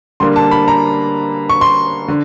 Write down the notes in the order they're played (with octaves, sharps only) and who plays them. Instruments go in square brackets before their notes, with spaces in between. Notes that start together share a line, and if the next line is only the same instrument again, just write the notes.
[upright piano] D3 G3 A#3 C6
A5
B5
A#5
C#6
C6
D3